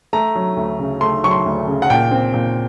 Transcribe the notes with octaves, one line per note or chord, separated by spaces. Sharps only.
A3 A#5
F#3
D2
C#3
A3 C6
F#3 C#6
C6
D2
C#3
F#5
A#2 G5
C4
A#2